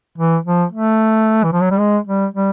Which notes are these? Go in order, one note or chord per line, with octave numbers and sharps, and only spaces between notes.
E3
F3
A3
E3
F3
F#3
G3
G#3
G3
G3